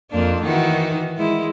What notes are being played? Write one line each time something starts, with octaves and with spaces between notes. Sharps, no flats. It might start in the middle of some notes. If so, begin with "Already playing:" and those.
F2 A#3 D4
D#3 E3 F#4
G#3 E4